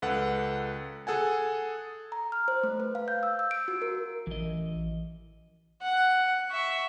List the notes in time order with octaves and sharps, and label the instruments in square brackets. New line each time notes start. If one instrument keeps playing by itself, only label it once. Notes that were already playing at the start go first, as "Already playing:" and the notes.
[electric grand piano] C#2 A4 B4 F#5
G#4 A4 F#5 G#5
[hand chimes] A#5
F6
C5
A3
B4
F5
G6
E6
E6
D7
F#4
A#4
[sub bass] A1 [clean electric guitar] E3 D#5
[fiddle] F#5
E5 C#6